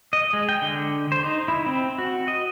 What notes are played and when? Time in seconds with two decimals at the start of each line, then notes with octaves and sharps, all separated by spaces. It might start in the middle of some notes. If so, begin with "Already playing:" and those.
0.13 D#5
0.33 G#3
0.49 G5
0.62 D3
1.12 C5
1.24 D#4
1.48 E4
1.66 C4
1.98 F#4
2.28 D#5